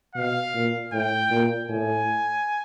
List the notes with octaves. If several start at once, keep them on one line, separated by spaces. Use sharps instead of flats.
B2 F5
A#2
A2 G5
A#2
A2 G#5